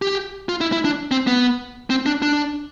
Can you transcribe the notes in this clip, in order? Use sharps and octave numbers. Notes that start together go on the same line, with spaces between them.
G4
F4
E4
E4
D4
C4
B3
C4
D4
D4